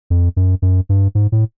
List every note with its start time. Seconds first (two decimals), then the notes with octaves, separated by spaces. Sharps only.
0.10 F2
0.37 F#2
0.62 F#2
0.89 G2
1.15 G#2
1.32 A2